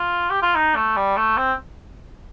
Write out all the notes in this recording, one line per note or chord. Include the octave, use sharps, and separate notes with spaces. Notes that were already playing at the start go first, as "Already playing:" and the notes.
Already playing: F4
G4
F4
D#4
A3
G3
A3
C4